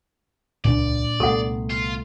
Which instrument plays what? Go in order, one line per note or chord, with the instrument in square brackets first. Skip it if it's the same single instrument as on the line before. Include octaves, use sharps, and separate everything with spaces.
[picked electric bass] D#1 C#2 [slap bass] A#2 D4 [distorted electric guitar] D5
[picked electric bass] C2 A3 B3 [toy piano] A4 F#5
[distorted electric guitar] F4